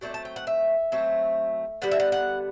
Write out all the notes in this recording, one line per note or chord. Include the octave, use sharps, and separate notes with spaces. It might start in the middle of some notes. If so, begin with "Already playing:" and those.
F#3 A3 C4 D5
A5
G5
F#5
E5
F#3 A3 C4
D3 G3 B3 F#5
E5
F#5
F#5